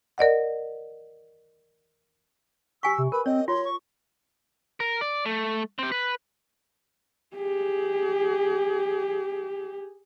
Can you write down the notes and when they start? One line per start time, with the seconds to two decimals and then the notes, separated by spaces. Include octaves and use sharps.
0.18 A#4 D5 D#5 F#5
2.83 G4 G#5 C#6 E6 B6
2.98 C3
3.12 A#4 B4 B5
3.26 C4 C#5 D#5
3.48 F4 C#5 C6
3.65 C#6
4.80 A#4
5.01 D5
5.26 A3
5.79 C4 G4
5.92 B4
7.35 G4 G#4